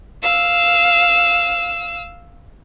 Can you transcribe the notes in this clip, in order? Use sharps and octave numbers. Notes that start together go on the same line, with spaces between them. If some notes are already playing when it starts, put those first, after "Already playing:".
F5 E6